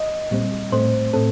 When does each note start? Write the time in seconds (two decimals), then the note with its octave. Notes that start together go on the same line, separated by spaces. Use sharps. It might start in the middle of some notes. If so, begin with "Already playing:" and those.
Already playing: D#5
0.31 A#2 G3 C4
0.72 A2 A3 C4 C5
1.13 A2 A3 C4 A4